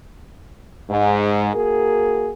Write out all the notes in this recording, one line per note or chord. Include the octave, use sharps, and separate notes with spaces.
G#2
A#3 F#4 G#4 A#4